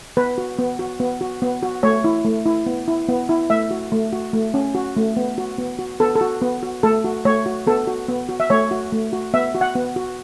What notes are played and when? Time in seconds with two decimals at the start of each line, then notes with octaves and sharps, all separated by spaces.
0.17 B3 B4
0.38 F#4
0.59 B3
0.79 F#4
1.00 B3
1.21 F#4
1.42 B3
1.63 F#4
1.83 A3 C#5
2.04 E4
2.25 A3
2.45 E4
2.66 B3
2.88 E4
3.09 B3
3.29 E4
3.50 A3 E5
3.71 F#4
3.92 A3
4.13 F#4
4.33 A3
4.54 C#4
4.75 F#4
4.96 A3
5.17 B3
5.38 F#4
5.58 B3
5.79 F#4
6.00 B3 A4
6.15 A4
6.21 F#4
6.42 B3
6.63 F#4
6.83 A3 A4
7.04 F#4
7.25 A3 C#5
7.46 F#4
7.67 B3 A4
7.87 F#4
8.08 B3
8.29 F#4
8.40 E5
8.50 A3 C#5
8.71 F#4
8.92 A3
9.13 F#4
9.34 B3 E5
9.55 F#4
9.61 F#5
9.75 B3
9.96 F#4